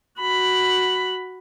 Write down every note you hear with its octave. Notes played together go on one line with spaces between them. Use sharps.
F#4 B5